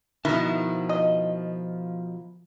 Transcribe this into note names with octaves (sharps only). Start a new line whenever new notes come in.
B2 D#3 F3 E4 A5
D#5